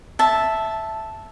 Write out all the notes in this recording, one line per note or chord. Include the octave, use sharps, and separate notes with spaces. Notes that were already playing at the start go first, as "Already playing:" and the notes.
E5 A5